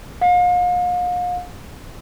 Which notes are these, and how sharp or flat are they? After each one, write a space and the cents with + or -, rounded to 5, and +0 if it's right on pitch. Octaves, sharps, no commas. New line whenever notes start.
F5 +40